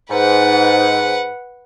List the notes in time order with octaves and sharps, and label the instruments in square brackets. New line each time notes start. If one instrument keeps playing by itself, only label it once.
[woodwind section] G#2 [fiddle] B4 F#5